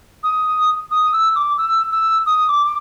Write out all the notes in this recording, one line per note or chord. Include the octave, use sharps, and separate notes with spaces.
D#6
D#6
E6
D6
E6
E6
D#6
D6
D6